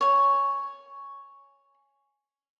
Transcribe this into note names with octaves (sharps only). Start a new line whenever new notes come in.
C#5 G#5